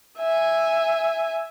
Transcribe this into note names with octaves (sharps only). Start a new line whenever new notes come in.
E5 G#5